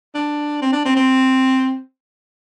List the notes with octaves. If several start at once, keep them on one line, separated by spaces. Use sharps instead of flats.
D4
C4
D4
C4
C4